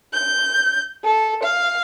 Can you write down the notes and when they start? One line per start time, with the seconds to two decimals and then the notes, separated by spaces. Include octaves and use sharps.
0.13 G6
1.06 A4
1.45 F5